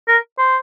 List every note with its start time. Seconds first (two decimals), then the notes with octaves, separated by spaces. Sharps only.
0.08 A#4
0.39 C5